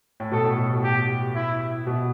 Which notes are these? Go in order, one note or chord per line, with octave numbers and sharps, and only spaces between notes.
A2
B2 A4
A2
B2
B2
G4
E4
B2